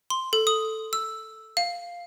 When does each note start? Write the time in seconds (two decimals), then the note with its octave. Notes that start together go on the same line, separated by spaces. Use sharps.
0.10 C6
0.33 A4
0.47 D#6
0.93 E6
1.57 F5